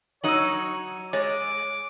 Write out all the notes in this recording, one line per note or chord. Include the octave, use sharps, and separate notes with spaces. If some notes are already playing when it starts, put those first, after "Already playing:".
F#3 D#4 C#5 E6 D#7 F#7
G#3 C#5 D6